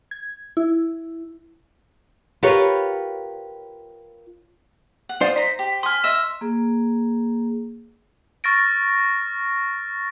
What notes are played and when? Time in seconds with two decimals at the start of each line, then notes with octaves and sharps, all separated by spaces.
0.11 G#6
0.57 E4
2.43 F4 G4 A#4 B4 C#5
5.09 F#5
5.21 F4 C5 D5 D#6
5.36 D#4 A#5 B6
5.59 G4
5.83 G#5 C6 D#6 F6
6.04 D#5 E5 E6 E7
6.41 A#3 G#4
8.44 C#6 F6 A6 A#6 D7